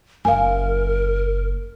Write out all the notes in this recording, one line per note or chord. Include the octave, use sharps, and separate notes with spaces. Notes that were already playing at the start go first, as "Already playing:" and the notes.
F#1 A#4 F5 G#5